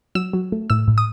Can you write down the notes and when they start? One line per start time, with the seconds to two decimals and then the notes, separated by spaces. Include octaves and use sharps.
0.15 F#3 E6
0.33 F#3
0.52 A3
0.70 A2 E6
0.88 A2
0.98 D#6